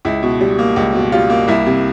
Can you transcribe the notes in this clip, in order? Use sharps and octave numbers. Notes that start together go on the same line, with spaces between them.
C#2 E4
B2
G3
A#3
C#2
B2
G3 F4
A#3
C2 E4
C3